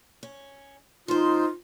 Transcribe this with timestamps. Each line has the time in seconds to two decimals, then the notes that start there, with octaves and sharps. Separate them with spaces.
0.23 C#4
1.08 F3 D#4 F4 C5